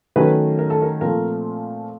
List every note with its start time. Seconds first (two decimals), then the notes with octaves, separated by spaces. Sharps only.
0.16 D#3 F#3 A3 C#4 B4
0.59 A#4
0.70 A4
0.82 A#4
1.01 A#2 F3 A3 C4 A#4